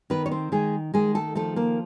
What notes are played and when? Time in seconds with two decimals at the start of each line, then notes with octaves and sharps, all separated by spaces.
0.10 D#3 B3 B4
0.26 C#5
0.31 C4 C5
0.52 D#3 G#3 G#4
0.94 D#3 G#3 G#4
1.15 A3 A4
1.35 F3 A3 A4
1.56 A#3 A#4